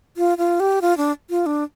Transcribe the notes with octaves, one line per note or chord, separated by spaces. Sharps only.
F4
F4
G4
F4
D4
F4
D4